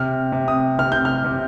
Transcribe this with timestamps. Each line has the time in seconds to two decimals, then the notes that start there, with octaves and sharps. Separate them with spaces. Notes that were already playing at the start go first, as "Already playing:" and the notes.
Already playing: C3 F6
0.32 C3
0.48 D#6
0.79 C3 F6
0.92 G6
1.05 F6
1.24 C3